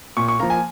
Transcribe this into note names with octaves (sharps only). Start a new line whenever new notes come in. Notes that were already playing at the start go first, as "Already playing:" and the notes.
A#2 C#6
C#6
F3 A#3 A#5
G#5